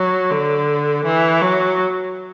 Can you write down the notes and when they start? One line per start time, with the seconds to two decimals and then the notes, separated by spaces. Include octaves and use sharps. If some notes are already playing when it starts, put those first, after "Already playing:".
Already playing: F#3
0.31 D3
1.05 E3
1.42 F#3